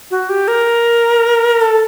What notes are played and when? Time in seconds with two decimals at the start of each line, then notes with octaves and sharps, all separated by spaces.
0.11 F#4
0.29 G4
0.48 A#4
1.61 A4